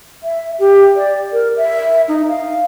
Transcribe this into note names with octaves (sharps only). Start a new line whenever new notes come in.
E5
G4
D5
A#4
E5
D#4
F5